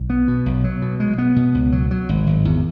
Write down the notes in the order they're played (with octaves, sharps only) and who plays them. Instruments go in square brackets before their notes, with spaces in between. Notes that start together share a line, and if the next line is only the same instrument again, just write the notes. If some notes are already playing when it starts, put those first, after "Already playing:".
Already playing: [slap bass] B1
B3
B2
B1
F#3
B2
G#3
B3
B2
C#2
F#3
F#3
G#1
G#1
E2